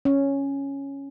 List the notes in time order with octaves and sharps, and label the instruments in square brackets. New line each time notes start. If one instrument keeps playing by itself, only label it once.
[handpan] C#4